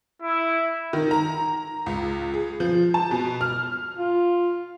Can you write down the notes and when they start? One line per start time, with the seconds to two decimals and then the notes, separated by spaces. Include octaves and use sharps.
0.22 E4
0.93 D#3
1.11 A#5
1.86 C#2
2.34 G#4
2.60 F3
2.94 A5
3.11 B2
3.41 F6
3.98 F4